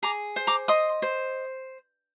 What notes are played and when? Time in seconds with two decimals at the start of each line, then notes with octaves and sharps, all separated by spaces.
0.03 G#4 A#5 D6
0.36 C5
0.47 A#5 D6
0.68 D#5 C6 D#6
1.02 C5